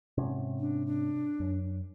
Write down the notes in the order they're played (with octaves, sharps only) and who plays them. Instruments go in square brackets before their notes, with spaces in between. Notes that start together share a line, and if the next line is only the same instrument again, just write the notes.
[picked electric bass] G#2 C3 C#4
[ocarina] D4
D4
[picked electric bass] F#2